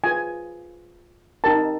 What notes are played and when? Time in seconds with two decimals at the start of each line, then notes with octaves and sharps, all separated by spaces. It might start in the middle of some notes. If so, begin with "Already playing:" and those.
0.04 F4 G#4 B4 G#5
1.44 D#4 G4 A#4 A5